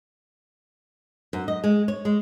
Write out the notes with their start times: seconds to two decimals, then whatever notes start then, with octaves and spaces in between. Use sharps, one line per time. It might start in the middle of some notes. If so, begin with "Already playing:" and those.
1.33 F#2
1.48 D#5
1.64 G#3
1.88 C#5
2.05 G#3